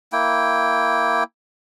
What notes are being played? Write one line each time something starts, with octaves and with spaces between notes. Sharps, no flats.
A#3 E4 G5